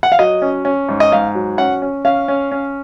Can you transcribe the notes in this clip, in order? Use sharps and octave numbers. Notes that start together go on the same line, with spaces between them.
F#5
F5
F#3 D#5
C#4
C#4
G#2
D#5
G#2 F5
F#3
C#4 F#5
C#4
C#4 F5
C#4
C#4